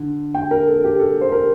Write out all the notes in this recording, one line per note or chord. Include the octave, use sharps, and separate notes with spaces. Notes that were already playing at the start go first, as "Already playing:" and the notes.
Already playing: D3
G5
A#4
A4
G4
A4
C5
A#4